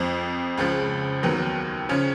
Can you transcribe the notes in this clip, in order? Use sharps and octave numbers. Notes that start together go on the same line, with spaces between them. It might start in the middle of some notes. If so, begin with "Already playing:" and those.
Already playing: F2 F3
C#2 C#3 F3
D#2 D#3 F#3 B3
C#3 F3 C#4